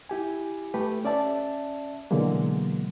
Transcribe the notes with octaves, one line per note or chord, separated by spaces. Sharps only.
E4 G4 G#5
A3 G4 A4 B4
C#4 D5 E5 A5
B2 D3 E3 F#3 G#3 A#3